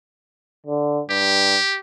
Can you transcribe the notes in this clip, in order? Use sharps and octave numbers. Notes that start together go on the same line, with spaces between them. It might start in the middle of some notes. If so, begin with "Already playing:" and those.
D3
G2 G4